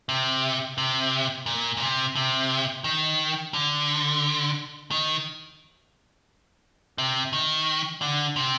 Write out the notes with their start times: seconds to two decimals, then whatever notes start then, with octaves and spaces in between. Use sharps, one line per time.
0.09 C3
0.78 C3
1.46 A#2
1.77 A#2
1.81 C3
2.16 C3
2.84 D#3
3.54 D3
4.91 D#3
6.98 C3
7.33 D#3
8.01 D3
8.36 C3